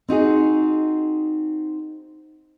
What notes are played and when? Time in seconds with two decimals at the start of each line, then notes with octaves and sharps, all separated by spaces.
0.08 C4 D#4 F#4 G#4